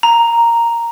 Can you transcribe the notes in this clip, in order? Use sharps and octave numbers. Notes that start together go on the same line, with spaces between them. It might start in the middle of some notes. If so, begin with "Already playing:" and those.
A#5